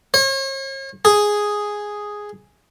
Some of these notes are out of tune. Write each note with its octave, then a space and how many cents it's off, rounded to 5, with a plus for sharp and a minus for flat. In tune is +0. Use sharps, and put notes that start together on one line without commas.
C#5 -45
G#4 +0